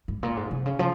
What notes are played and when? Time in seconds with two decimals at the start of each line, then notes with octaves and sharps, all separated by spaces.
0.08 G#2
0.23 A#2
0.37 G#2
0.51 C3
0.66 C#3
0.79 F3